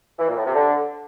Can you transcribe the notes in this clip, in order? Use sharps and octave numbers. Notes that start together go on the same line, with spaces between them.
E3
A#2
A2
C3
D3